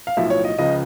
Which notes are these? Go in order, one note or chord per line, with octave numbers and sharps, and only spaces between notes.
F5
B1 A2 F3 E5
C#5
D#5
C#2 C#3 F3 D#5